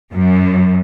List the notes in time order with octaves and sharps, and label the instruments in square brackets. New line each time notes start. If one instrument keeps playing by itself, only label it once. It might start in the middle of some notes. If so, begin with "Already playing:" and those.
[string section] F#2